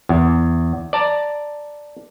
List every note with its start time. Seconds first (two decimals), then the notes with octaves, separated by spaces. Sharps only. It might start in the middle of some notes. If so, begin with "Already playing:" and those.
0.09 E2
0.93 D5 A5 A#5